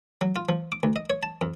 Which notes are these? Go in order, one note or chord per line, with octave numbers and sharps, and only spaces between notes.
F#3
F4
F3
D6
D2
D#5
C#5
A5
F2